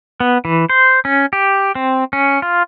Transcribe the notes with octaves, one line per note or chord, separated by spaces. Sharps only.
B3
E3
C5
C#4
G4
C4
C#4
F4